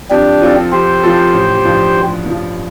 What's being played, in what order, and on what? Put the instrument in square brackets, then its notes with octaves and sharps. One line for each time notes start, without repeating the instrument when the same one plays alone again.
[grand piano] F2 [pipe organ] D4 G4
[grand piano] F3 C4 F4 A4
[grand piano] F2 [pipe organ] G4 C5
[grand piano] F3 C4 F4 A4
A1
G2 F3
A1
G2 F3